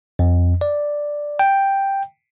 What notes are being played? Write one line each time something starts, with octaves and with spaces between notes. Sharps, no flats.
F2
D5
G5